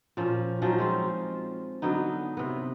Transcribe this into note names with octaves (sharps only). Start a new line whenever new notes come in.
A#2 F3 C#4
F3 F#3 C#4 D#4
G#3 C4 F4
D3 F#3 B3 D#4
C3 B3